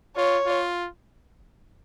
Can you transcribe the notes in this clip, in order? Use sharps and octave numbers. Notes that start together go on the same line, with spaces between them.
F4 C#5
F4